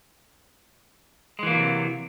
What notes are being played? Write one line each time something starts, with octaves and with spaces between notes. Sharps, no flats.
C3 E3 F#3 G#3 A#3